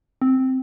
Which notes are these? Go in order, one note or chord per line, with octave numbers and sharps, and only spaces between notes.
C4